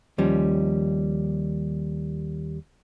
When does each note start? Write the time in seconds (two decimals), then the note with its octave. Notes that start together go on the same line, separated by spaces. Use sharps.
0.18 D#2 F3 G3 C#4